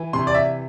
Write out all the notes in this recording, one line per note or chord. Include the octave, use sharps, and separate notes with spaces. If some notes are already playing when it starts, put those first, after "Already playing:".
Already playing: E3
C3 C6
D5
E5